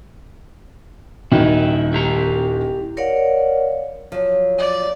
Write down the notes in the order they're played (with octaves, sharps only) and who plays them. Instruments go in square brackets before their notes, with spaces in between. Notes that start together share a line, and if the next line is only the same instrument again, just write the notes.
[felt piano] D#1 D#3 F#4 [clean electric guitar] D#4 E4
[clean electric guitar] E4 G4 A#5
[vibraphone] A#4 C#5 D5 F5 F#5
[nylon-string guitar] F3 F#3
[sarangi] D5